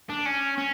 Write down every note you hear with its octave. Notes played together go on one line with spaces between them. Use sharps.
D4
C#4
C#4